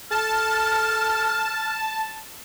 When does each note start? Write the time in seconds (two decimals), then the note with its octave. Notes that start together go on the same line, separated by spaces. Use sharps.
0.11 A4 A5 F6